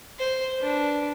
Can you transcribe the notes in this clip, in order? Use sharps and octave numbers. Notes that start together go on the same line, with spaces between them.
C5
D4 B4